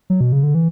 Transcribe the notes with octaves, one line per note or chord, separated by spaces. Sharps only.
F#3
B2
C#3
D3
E3